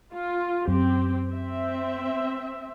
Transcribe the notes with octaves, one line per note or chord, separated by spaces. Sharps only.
F4
F#2 C4 G4
C4 E5